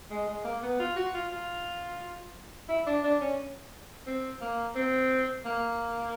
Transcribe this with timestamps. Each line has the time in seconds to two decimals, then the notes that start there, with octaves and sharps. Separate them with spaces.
0.11 G#3
0.28 G#3
0.45 A#3
0.63 B3
0.80 F4
0.96 F#4
1.14 F4
1.31 F4
2.69 E4
2.87 D4
3.04 D4
3.21 C#4
4.06 C4
4.41 A#3
4.75 C4
5.45 A#3